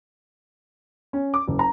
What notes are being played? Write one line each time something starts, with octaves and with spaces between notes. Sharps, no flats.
C#4
D6
F#1
A#5